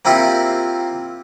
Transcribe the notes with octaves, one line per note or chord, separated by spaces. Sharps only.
A#3 C4 E4 F4 G4